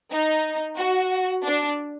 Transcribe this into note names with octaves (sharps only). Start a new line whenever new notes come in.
D#4
F#4
D4